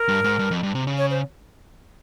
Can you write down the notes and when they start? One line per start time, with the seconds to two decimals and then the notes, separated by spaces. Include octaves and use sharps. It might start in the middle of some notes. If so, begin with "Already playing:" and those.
Already playing: A#4
0.08 G2
0.24 G#2
0.39 G2
0.51 F2
0.63 G2
0.75 C3
0.87 C#3
0.98 C#5
1.10 C5